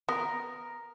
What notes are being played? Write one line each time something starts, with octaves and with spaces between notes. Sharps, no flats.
B3 A#4